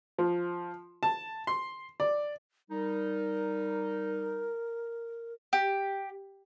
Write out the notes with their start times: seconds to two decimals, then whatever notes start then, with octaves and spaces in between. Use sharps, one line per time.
0.18 F3
1.03 A5
1.47 C6
2.00 D5
2.71 G3 D#4 A#4
5.53 G4